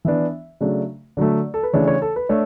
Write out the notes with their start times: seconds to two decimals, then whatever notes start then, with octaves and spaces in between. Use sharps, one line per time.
0.05 E3 B3 D4 E5
0.61 C#3 F#3 A3 D4
1.17 D3 F#3 A3 D5
1.54 A4
1.63 B4
1.73 C#3 E3 A3 D4 C#5
1.87 C#5
2.02 A4
2.16 B4
2.29 A3 D4 C#5